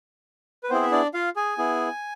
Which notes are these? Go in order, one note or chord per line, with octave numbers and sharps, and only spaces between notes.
B4
B3 C4 E4 G#4 C5
E5
D4 D5
F4 F5
G#4 G#5
B3 E4 G#4